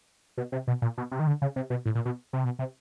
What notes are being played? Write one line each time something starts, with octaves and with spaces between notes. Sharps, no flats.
B2
C3
B2
A#2
B2
C3
D#3
D3
C#3
C3
B2
A2
A#2
B2
C3
B2
C3